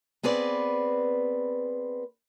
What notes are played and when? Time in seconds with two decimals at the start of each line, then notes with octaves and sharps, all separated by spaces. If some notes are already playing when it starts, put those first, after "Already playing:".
0.23 B3 C4 G#4 B4 D5